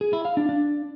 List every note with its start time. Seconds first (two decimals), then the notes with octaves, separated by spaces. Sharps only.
0.01 G#4
0.13 E4
0.25 F5
0.37 D4
0.49 D4